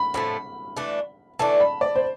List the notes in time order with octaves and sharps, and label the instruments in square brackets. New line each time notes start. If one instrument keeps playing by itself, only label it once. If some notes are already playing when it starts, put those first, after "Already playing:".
Already playing: [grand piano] B5
[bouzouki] A2 F3 A3 [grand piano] B5
[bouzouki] E3 A3 D4
[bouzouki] E3 A3 D4 [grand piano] A5
[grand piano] B5
D5
C5